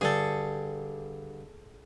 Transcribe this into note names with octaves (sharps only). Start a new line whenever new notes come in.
G2 D3 G#4 A4 G5